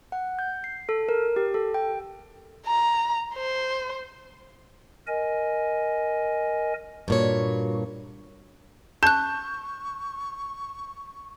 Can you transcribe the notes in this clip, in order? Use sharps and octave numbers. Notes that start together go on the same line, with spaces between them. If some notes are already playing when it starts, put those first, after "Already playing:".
F#5
G6
C7
A4
A#4
G4
A4
G5
A#5
C5
A#4 D#5 G#5
G2 A#2 F#4 C#5
A5 C#6 F#6 G6